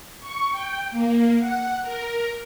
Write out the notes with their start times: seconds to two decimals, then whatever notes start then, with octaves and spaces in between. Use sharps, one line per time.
0.20 C#6
0.51 G5
0.91 A#3
1.39 F#5
1.82 A#4